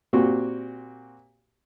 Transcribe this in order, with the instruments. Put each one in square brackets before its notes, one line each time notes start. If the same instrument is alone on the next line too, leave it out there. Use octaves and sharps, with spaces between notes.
[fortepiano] A#2 C4 F#4 G4 C#6